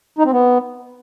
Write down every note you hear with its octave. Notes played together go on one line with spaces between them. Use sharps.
D#4
C4
B3